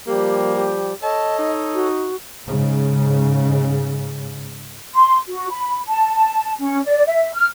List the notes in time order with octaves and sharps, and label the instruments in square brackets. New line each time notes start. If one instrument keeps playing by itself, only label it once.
[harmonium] F3 G3 [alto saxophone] A#3 [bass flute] G4
[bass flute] G4
[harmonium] A4 C#5 [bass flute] D#5 [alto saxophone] A5
[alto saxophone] D#4
[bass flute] F#4
[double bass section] G#2 C#3
[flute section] C6
F#4
B5
A5
C#4
D5
E5
F6